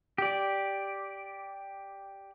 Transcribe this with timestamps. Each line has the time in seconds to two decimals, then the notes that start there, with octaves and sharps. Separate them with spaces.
0.18 G4 D5